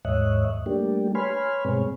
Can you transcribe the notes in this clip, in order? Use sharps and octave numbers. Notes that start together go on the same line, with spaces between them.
D#2 G#2 C#5 D#5 E5 F#6
G3 A3 A#3 D4 G4
B4 C#5 G#5 B5 C6 F6
G2 B2 G#3 C4 C#5